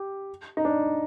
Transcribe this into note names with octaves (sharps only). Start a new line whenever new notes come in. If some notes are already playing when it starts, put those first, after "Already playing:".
Already playing: G4
D#4
D4